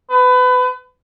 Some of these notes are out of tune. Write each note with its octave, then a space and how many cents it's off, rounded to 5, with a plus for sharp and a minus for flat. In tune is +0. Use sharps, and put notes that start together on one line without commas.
B4 +25